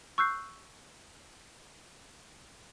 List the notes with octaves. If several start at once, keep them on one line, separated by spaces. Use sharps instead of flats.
C#6 E6 F#6 G6 C7